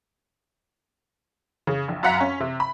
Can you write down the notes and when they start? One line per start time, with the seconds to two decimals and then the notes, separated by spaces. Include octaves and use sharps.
1.67 C#3
1.88 A#1
2.03 F#2 F5 F#5 A#5 B6
2.20 C#4
2.40 C3
2.60 B5